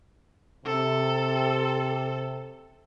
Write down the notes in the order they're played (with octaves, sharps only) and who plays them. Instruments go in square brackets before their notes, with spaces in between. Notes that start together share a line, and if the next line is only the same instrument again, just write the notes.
[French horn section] C3 [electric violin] A4